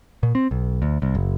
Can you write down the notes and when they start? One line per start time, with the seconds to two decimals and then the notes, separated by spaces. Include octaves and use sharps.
0.23 A#2
0.35 C4
0.51 B1
0.82 D2
1.02 C2
1.15 F#1